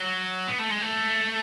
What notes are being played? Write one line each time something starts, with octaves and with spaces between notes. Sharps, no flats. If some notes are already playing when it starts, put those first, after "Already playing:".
Already playing: F#3
B3
A3
G#3
A3